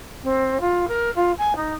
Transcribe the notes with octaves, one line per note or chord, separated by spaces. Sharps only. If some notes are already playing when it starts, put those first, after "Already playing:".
C4
F4
A#4
F4
G#5
D#4